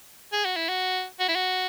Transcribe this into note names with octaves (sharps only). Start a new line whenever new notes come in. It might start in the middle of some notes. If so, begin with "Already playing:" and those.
G#4
F#4
E4
F#4
F#4
E4
F#4